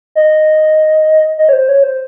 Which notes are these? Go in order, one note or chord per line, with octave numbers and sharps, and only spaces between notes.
D#5
D#5
C#5
C5
C#5
C5